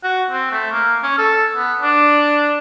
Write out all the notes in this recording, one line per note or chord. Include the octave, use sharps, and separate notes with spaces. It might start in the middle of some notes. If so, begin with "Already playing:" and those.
F#4
C4
A3
A#3
C#4
A4
B3
D4